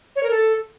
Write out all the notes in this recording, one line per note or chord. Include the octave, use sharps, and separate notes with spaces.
C#5
A#4
A4